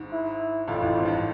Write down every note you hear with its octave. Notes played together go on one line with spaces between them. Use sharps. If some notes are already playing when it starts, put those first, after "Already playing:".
Already playing: G#1 G#2
E4
A1 A2 F4
A1 A2
G#1 G#2
G2